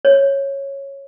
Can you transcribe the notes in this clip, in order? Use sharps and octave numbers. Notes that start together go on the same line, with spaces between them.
C#5